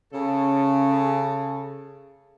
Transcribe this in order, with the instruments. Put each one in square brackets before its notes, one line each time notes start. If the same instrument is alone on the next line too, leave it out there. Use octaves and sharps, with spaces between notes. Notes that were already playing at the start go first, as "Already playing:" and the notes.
[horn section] C#3 A4